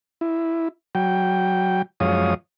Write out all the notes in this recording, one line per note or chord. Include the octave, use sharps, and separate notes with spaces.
E4
F#3 G5
F#2 F3 G#3 C#5 F5 D#6